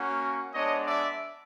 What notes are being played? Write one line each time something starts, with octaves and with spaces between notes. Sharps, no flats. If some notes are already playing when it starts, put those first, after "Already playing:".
Already playing: A#3 C#4 F#4
G#3 B3 D4 C#5 D#5
D5 E5